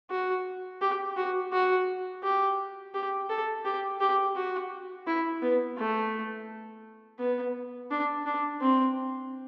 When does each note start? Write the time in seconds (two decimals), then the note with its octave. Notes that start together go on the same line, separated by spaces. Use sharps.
0.11 F#4
0.82 G4
1.17 F#4
1.53 F#4
2.23 G4
2.94 G4
3.29 A4
3.65 G4
4.01 G4
4.36 F#4
5.07 E4
5.42 B3
5.78 A3
7.19 B3
7.91 D4
8.26 D4
8.61 C4